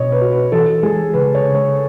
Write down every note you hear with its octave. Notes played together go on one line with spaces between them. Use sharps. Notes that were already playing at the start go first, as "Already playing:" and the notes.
Already playing: B2 C#5 D#5
B4
F#4
B4
E3 A4
G#3 G#4
C#3 B4
C#5
C#3
C#5